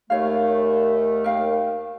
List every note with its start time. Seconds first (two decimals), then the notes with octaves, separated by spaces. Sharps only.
0.10 D#2 A3 C#5 F5
1.24 A#4 F5 G5